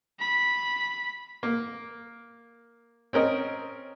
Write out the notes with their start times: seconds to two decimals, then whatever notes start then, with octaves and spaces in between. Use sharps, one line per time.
0.19 B5 B6
1.43 A#3
3.13 C4 C#4 A#4 D#5